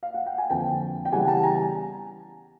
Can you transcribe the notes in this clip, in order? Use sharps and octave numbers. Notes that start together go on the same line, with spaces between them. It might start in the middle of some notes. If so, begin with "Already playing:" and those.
F5
F#5
G5
G#5
F2 D3 F3 A#3 G5 A5
G5
C#3 E3 G3 B3 F#5 G#5
G5 A5
G#5 A#5